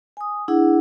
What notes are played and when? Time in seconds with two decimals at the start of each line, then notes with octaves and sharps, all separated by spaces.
0.17 G#5 D#6
0.48 D4 E4 G#4 F#5